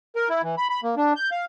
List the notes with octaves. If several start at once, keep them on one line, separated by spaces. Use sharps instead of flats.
A#4
E4
E3
B5
B5
A#3
D4
G6
F5